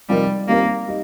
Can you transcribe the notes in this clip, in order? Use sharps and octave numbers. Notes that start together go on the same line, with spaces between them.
C3 F3 G3 D#4 A#4
D#3 G3 A#3 C4 F4 A#4
G3 D#4